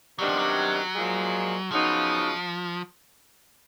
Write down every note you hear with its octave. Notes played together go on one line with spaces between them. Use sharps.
C3 D#3 F#3 G3 B3 D4
F3
F#3
A#2 F3 G#3
C#3 F3 F#3 B3 D#4